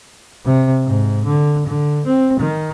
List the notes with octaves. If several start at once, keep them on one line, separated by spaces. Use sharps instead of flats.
C3
G#2
D3
D3
C4
D#3